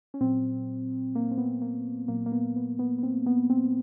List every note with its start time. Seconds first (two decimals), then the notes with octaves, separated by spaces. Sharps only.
0.14 C#4
0.21 A#2 F#3 C4
1.15 A#3
1.31 C4
1.38 B3
1.62 A#3
2.08 A#2 F#3 A#3
2.26 A#3
2.32 B3
2.56 B3
2.79 B3
2.99 B3
3.03 C4
3.26 B3
3.50 C4